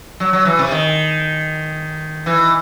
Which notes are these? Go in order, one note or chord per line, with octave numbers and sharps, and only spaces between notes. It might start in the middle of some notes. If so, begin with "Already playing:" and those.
F#3
F#3
E3
C3
D#3
E3